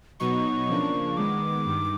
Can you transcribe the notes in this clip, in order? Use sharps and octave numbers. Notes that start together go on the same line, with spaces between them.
B2 F#3 B3 D#4 C#6
C#3 F3 A#3 D4
D#3 G#3 B3 D6
G2 D#3